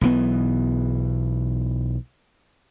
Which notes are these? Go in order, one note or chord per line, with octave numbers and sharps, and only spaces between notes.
B1 E3 B3